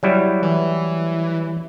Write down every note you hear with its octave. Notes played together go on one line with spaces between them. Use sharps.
F#3 G3 E4
E3